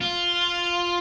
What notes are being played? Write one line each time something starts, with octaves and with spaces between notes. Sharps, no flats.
F4